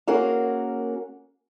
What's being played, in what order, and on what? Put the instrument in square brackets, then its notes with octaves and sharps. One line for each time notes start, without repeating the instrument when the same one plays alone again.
[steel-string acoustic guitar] A#3 C#4 F#4 G#4 A#4